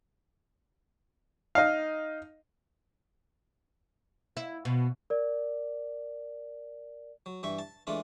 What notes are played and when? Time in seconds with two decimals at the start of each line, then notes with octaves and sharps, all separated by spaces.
1.55 D#4 F5
4.37 E4
4.65 B2
5.10 A#4 D5
7.26 F#3
7.43 G2 E3 E5 C#6
7.59 A5
7.87 E3 G#3 A3 D4 F4